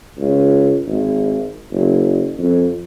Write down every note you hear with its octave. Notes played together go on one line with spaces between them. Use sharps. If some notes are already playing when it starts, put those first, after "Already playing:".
C#2
G#1
F#1
F2